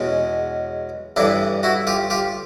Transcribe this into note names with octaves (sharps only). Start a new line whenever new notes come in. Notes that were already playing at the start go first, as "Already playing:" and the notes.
Already playing: E2 B2 G#3 C#4
A1 G2 E3 D4 E4
E4 F#4
F4 G4
F4 G4